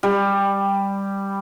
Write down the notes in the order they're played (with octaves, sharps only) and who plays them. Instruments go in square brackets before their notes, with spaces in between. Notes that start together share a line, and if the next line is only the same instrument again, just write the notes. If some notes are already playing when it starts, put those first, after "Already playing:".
[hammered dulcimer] G3